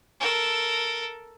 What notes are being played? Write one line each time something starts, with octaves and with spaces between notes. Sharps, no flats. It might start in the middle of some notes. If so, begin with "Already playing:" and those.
A4 A#4